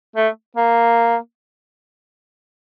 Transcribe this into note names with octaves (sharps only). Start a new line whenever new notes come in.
A3
A#3